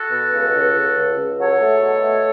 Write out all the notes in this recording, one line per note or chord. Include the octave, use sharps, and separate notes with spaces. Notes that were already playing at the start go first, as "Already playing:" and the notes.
Already playing: F#4 A4
B2
C#2
C#2
C#2
C#2
C#2
F#3 A4 C#5
A3
B2
A3